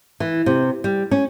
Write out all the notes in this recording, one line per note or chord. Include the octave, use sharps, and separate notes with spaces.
E3
C3
G3
C#4